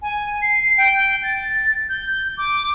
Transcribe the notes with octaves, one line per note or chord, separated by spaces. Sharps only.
G#5
C7
G5
A6
G6
D6